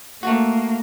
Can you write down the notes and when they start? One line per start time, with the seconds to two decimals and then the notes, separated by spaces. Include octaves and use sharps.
0.23 A3 A#3 F#4